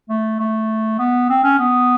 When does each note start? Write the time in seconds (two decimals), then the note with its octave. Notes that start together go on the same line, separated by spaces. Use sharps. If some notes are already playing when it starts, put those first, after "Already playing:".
0.09 A3
0.40 A3
0.99 B3
1.29 C4
1.44 C#4
1.59 B3